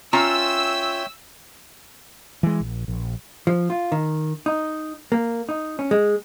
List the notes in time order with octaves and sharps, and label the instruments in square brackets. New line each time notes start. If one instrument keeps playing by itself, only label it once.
[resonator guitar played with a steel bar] C#4 F4 A#5 [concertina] C#5 E5 G5 [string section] E6
[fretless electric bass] E3 G#3
A#1
A#1
[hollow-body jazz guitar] F3
F4
D#3
D#4
A#3
D#4
C#4
G#3